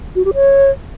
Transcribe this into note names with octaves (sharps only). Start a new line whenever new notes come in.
F#4
G4
C#5